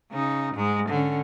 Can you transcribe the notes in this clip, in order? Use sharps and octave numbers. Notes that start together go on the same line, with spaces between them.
C#3 D#4
G#2 G#3
D3 C#4